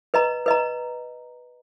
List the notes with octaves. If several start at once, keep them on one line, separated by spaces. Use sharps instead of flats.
B4 D#5 A#5
B4 D#5 A#5